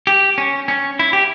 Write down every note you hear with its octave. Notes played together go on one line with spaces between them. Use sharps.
G4
C#4
C#4
E4
G4